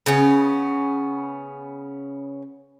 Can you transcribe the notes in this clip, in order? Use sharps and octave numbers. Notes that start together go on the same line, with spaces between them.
C#3 B3 C#4